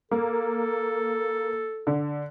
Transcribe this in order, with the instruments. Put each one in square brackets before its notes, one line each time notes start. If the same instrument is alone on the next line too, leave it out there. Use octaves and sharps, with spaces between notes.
[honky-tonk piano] A#3 [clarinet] A4
[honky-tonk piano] D3